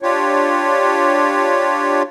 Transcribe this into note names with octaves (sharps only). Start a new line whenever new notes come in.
D4 F4 G4 C#5